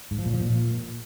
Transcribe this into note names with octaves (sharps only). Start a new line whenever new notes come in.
G#2
F3
A#2
F3
A#2